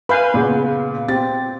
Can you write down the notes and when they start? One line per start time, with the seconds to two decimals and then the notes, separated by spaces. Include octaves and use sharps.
0.09 B4 F5 G#5 B5 G6
0.34 A#2 C#3 B3
1.08 C4 G4 A6